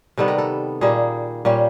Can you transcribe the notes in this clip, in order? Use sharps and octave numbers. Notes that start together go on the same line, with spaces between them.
C3 D#3 G3 B3 A4
A#4
A4
A#2 G3 A#3 D#4 G#4
A#2 G3 A#3 C#4 G4